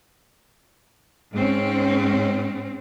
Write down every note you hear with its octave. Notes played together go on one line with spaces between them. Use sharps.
G#2 C4 C#4